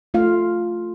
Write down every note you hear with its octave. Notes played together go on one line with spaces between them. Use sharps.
A3 F4 F5